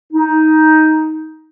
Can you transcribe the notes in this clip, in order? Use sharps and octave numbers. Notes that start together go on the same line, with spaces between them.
D#4